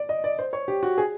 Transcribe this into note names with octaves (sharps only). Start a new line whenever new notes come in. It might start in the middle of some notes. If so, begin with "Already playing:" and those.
Already playing: D5
D#5
D5
C5
C#5
G4
F#4
G#4